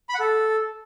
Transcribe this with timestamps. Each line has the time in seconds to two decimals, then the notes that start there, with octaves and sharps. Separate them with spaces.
0.09 B5
0.15 F#5
0.20 A4